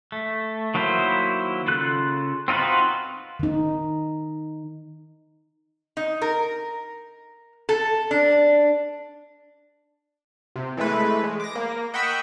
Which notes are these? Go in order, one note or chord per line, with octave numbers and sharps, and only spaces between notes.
A3
D#3 F#3 A#3 E4 C5
C#3 F4 A4 F#6
C4 D#4 F4 F#4 B4
D#3 D#4
D#4
A#4
A4
D4
C3
E3 G#3 A3 B4
G#3
D6 A#6
A#3
D#5 F#5 G5 B5 C#6 E6